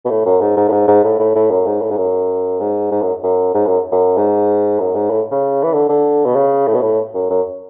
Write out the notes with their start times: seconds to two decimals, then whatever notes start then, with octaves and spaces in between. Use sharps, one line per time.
0.05 B2
0.10 A2
0.26 F#2
0.41 G#2
0.57 G#2
0.68 A2
0.72 G#2
0.88 G#2
1.04 A2
1.19 A2
1.35 A2
1.50 F#2
1.66 G#2
1.82 A2
1.91 G#2
1.97 F#2
2.60 G#2
2.92 G#2
3.02 F#2
3.23 F#2
3.54 G#2
3.67 F#2
3.92 F#2
4.17 G#2
4.80 F#2
4.95 G#2
5.10 A2
5.31 C#3
5.63 E3
5.73 D3
5.89 D3
6.26 B2
6.36 C#3
6.67 A2
6.74 B2
6.81 A2
7.14 F#2
7.30 F#2